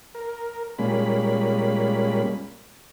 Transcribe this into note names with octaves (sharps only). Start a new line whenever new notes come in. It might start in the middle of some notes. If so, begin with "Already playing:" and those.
A#4
A#2 G3 G#3 A#3 C#4 B5